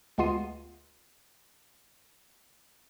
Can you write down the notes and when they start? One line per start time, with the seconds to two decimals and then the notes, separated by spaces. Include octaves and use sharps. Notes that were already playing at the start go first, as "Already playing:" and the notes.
0.18 D2 G#3 B3 F4 C7 D#7